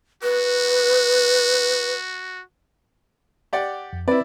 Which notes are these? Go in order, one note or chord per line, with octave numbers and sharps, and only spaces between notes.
F#4 B4
G4 D5 F#5
F2
C4 E4 B4 D5